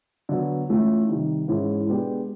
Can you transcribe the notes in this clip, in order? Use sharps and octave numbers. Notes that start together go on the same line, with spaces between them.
D3 F#3 B3
E3 A3 C#4 F4
C3 D#3 G3
G#2 E3 G#3 C#4 E4
B2 G#3 B3 D4 G4